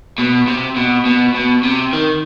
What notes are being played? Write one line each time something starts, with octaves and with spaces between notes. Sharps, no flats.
B2
C3
B2
B2
B2
C3
D#3